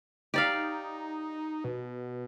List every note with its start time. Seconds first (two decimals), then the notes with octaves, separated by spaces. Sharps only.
0.34 D#4 G4 D5 F5
1.64 B2